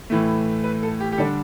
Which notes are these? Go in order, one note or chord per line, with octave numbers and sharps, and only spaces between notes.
A2 E3 A3
B4
A4
G4
G4
D3 G3 D4 A4